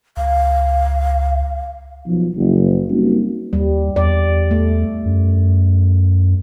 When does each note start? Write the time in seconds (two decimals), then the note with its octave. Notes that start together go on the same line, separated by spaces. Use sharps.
0.17 C#2 F5
2.06 B1 F3
2.36 F#1
2.90 G3 A#3 C4 C#4 D#4 F#4
3.53 D#2 G3
3.96 E2 D5
4.51 A3
5.06 F#2